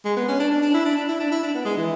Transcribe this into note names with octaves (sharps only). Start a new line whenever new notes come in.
G#3
B3
C#4
D4
D4
D4
E4
D4
D4
E4
D4
E4
D4
B3
G#3
E3